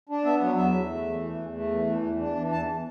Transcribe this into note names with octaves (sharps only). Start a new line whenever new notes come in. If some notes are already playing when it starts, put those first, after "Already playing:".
D4
B3 E5
F#3
E2 E5
E2
A3
E3
E2
E2
A3
E3
E2
E2
D4
E3
E2 A5